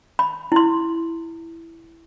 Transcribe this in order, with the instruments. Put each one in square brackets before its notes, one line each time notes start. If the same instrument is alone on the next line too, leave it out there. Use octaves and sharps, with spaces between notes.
[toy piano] B5
E4 C6